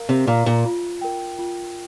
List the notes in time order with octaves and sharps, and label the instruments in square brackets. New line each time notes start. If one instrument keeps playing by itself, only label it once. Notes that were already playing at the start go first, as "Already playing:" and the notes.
Already playing: [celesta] A#4 F5 A#5
[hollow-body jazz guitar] C3
[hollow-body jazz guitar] A#2 [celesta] F5 A#5
[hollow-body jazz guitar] A#2
[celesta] F4
A#4 G5
F4